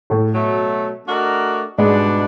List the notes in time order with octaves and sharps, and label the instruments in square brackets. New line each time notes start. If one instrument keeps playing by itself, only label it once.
[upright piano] A2 A3
[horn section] B2 F#3 A3
A3 D4 F#4 A#4 D#5
[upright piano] G#2 G#3 [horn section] B2 G3 B3 D4